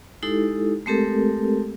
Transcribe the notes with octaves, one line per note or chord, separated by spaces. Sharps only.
G#3 D#4 E4 G4 A4
G#3 A3 C4 G4 A4 A#4